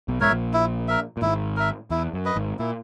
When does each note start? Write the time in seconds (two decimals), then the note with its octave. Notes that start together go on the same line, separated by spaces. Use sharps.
0.08 B1 B2
0.20 G#2 A#4 C#5 E5
0.31 A#1 A#2
0.53 E4
0.88 A#4 E5
1.17 A#2
1.22 G#1 G#2 E4
1.57 A#4 E5
1.90 E2 E4
2.13 F#2
2.25 B4 D#5
2.35 G#1 G#2
2.59 A#2 E4